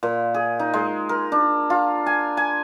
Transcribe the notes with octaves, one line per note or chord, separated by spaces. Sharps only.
A#2
G#4
D#4
G#3
A#4
D4
F4
G#5
G#5